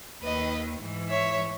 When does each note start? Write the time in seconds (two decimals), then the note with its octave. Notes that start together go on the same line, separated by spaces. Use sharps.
0.23 D#2 D#3 B4 D#5
0.81 G#2 E3
1.10 C#5 E5